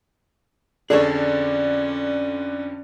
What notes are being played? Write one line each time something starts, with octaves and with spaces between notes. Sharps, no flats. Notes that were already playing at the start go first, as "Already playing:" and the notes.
F2 D3 C#4 G#4 A4 C#5 D5